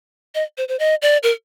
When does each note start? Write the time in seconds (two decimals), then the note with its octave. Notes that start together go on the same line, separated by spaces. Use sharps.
0.35 D#5
0.58 C5
0.68 C5
0.79 D#5
1.02 D5
1.23 A#4